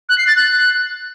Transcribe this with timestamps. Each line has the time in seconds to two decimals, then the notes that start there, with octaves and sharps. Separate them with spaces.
0.09 F#6
0.18 C7
0.27 A6
0.36 F#6